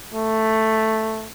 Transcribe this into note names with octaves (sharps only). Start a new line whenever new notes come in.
A3